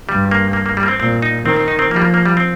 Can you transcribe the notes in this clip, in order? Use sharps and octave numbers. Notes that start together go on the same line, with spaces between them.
G2 G3
A#3
A#3
A#3
G3
A#3
C4
A#2 C4
D#4
D#3 C4
C4
D#4
C4
F3 A#3
G3
A#3
A#3
G3
C4